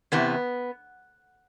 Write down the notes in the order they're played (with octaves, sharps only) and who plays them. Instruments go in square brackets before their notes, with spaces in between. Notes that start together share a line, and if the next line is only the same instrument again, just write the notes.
[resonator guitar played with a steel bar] E2 C3 E3 B3